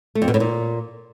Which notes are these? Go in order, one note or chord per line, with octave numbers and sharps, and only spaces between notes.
A3
F2
B2
A2
A#2